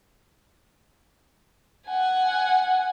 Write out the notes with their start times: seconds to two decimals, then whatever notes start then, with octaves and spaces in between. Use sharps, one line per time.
1.88 F#5 G#5